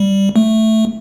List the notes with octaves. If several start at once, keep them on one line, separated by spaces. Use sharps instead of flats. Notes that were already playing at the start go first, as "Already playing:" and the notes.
Already playing: G3
A3